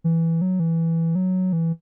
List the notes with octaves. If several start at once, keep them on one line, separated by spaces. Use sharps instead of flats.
E3
F#3
E3
F#3
E3